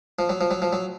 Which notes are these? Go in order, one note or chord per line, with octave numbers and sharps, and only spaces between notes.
F3
F#3
F3
F#3
F3
F#3